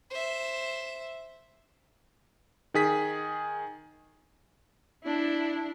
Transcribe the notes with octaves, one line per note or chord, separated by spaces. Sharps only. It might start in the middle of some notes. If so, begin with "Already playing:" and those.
C5 E5
D#3 G#4 B6
D4 E4